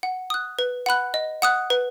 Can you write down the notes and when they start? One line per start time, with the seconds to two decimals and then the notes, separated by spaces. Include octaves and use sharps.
0.03 F#5
0.30 D#6 F#6
0.59 B4
0.86 F#5 B5 F#6
1.14 D#5
1.42 F#5 D#6 F#6
1.70 B4